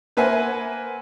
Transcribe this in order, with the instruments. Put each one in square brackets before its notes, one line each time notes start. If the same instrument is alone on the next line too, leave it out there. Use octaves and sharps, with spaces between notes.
[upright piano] A#3 B4 C5 E5 F#5 G#5